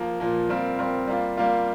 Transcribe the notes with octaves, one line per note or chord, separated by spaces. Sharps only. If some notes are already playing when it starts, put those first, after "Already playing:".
Already playing: F3 A#3
A#2 F3 A#3
G3 C4 F4 A#4
G3 C4 F4 A#4
G3 A#3 F4
G3 A#3 F4